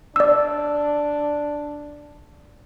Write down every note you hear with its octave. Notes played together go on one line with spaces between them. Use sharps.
D4 D5 E6